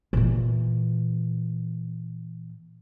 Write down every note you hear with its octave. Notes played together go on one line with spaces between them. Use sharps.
A#2 E3